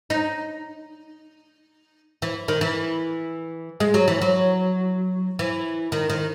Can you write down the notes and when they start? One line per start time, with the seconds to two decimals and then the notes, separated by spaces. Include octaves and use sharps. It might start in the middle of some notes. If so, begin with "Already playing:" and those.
0.10 D#4
2.22 E3
2.48 D#3
2.61 E3
3.80 G#3
3.94 F#3
4.08 E3
4.21 F#3
5.39 E3
5.92 D#3
6.10 D#3